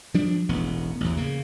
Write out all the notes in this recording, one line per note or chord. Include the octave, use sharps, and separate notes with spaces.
F3 G3 D4
E1 A1 B3
A1 E2
C#3 A#3